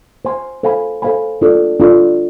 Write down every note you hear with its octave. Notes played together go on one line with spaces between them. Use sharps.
C5 G#5 C6
A4 C5 F5 G#5 B5
A4 C5 F5 G#5 B5
D4 F4 A4 D5
D4 F4 A4 D5